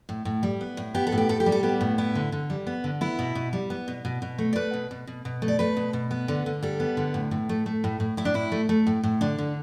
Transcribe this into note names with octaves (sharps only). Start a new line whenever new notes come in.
A2
A2
G3
B3
A2
B3 G4
A4
A2
G4
A2 A4
G4
G3
A4
B3 G4
A2
B3 E4
D3
D3
G3
B3
D3
B3 E4
B2
B2
G3
B3
B2
B2
B2
A3
D5
A3 B4
B2
B2
B2
B2
A3
D5
A3 B4
B2
B2
B3
D3
D3
G3 A4
B3
D3
A2
A2
A3
A3
A2
A2
A2 E4
D4
A2 E4
A3
A3
A2
A2
D3 D4
D3